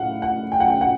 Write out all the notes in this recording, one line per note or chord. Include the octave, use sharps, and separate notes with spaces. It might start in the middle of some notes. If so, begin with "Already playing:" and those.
Already playing: A2 F5 F#5
F#5
G5
F#5
G5
F#5